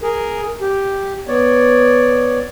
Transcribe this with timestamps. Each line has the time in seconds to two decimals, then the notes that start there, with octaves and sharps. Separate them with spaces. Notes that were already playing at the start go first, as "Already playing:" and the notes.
0.02 G#4 A#4
0.61 G4
1.28 B3 C#5 D5